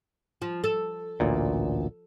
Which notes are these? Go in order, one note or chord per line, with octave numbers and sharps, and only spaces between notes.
F3
A4
A1 D2 A#2